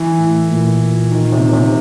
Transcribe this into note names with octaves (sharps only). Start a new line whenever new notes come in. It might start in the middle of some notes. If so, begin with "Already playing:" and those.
Already playing: E3
A2
A#2
D#3
C3
C3